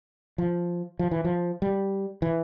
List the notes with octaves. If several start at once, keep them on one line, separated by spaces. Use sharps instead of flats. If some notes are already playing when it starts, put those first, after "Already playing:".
F3
F3
E3
F3
G3
E3